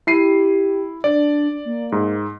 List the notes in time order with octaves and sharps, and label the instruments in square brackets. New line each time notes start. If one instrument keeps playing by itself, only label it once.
[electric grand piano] E4 C7 D#7 [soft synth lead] G4
[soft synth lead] D4 [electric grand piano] D5
[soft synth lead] A#3
[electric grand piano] G#2